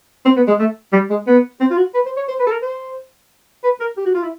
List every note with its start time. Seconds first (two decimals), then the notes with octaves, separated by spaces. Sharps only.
0.25 C4
0.36 B3
0.47 G#3
0.59 A3
0.93 G3
1.10 G#3
1.27 B3
1.60 C4
1.70 F4
1.77 F#4
1.94 B4
2.06 C5
2.17 C#5
2.28 C5
2.39 B4
2.47 A4
2.51 A#4
2.62 C5
3.64 B4
3.80 A#4
3.97 G4
4.06 F#4
4.14 F4
4.23 E4